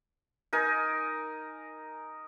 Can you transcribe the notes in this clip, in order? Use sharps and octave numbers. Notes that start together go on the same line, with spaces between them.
D#4 A#4 G#5